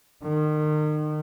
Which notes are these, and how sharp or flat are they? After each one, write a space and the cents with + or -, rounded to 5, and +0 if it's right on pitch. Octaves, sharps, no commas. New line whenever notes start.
D#3 -35